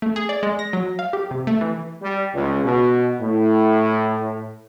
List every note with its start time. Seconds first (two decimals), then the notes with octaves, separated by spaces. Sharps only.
0.02 A3
0.16 G#4
0.29 D5
0.43 G#3
0.59 A#6
0.73 F#3
0.99 F5
1.13 G4
1.31 C3
1.47 A3
1.61 E3
2.02 G3
2.34 C#2
2.65 B2
3.20 A2